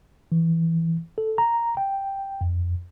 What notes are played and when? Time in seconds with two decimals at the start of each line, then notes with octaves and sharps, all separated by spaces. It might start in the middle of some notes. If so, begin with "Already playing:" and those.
0.32 E3
1.18 A4
1.38 A#5
1.77 G5
2.41 F2